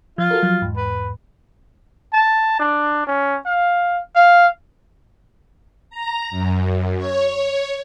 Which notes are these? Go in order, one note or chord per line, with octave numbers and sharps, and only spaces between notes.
F3 F4
F#4 A4 A#4
F3 F#3
E2 G#2
B4
A5
D4
C#4
F5
F5
A#5
F#2
C#5